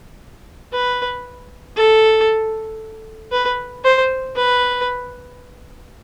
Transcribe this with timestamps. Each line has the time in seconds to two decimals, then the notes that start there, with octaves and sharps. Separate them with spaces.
0.73 B4
1.77 A4
3.32 B4
3.84 C5
4.36 B4